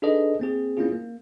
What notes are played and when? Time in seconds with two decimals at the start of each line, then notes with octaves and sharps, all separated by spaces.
0.02 D4 D#4 G#4 A4 B4 D#5
0.39 A#3 C4 G#4
0.77 A#3 C4 C#4 E4 F4 G#4
0.92 A#3